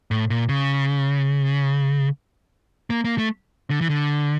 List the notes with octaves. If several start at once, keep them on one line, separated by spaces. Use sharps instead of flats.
A2
A#2
C#3
A#3
A#3
A3
D3
E3
D3